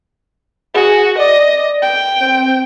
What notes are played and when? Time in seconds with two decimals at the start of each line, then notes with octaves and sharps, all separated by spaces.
0.74 F#4 G#4
1.18 D5 D#5
1.82 G5
2.20 C4